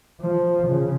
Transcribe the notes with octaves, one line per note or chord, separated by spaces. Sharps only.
F3
C#3